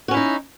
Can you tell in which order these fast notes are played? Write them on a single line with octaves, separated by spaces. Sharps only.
F#4 C#4 E4 D#4